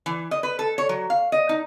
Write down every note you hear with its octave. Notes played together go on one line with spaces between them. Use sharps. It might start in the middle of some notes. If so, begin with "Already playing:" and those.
E3
D#5
B4
A4
C#5
F#3
F5
D#5
D#4